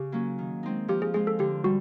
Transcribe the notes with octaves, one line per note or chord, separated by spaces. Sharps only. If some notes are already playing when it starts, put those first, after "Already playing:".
Already playing: C#3 G4
F#3 A#3 C#4
D#3
G#3 C4 D#4
F3 G4
G#4
G#3 C4 F4 G#4
A4
D3 G4
G3 F#4